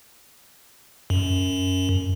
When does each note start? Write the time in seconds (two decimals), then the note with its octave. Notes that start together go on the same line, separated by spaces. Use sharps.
1.10 F#2